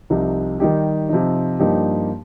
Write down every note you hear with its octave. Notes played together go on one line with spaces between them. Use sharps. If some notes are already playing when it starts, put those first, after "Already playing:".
C2 C3 F3 D#4 G4
D#3 G3 D#4 G4
C3 F3 D#4
G2 F3 A#3 D#4 G4